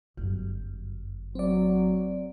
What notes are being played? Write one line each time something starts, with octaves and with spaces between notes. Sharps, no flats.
G1 F#2
F#3 C4 D5